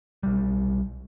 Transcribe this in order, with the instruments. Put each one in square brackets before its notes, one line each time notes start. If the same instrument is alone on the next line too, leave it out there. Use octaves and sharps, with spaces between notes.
[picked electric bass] B1 G3